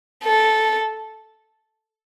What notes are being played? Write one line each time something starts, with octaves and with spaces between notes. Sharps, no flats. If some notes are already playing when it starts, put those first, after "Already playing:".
A4